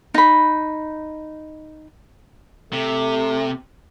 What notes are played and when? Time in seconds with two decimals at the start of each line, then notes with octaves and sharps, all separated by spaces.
0.14 D#4 B5
2.73 C3 A3